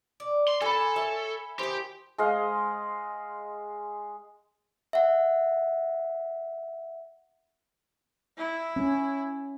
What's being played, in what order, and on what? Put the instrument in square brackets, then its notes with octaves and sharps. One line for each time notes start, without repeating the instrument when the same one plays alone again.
[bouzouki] D5
[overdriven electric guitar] C6
[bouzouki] A#2 A#3 [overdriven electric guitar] A4 [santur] G#5 B5
[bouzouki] C#5 [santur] E5
[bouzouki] D#3 E4 [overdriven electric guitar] G4 [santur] C5
[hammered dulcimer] G#3 D#5 F5
[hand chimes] E5 F#5
[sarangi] E4
[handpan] C#4